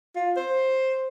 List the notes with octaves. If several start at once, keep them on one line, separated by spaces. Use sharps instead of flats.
F4
C5